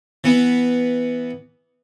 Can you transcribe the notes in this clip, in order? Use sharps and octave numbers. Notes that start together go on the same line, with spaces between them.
E3 B3